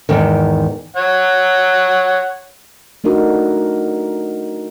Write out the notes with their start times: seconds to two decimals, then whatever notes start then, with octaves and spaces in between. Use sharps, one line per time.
0.09 E2 G#2 D#3
0.96 C#5 F#5
3.04 A3 D4 D#4 F#4 A#4